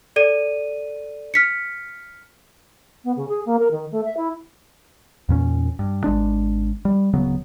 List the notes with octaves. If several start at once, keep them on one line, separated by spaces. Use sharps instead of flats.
A4 D5 D#7
F6 B6 C#7
B3
C#3
G#4
A#3
A#4
D#3
A3
E5
E4
E2 A#2 C#4
G2
G#1 G#3 D4
G3
D1 C#3 F#3 B3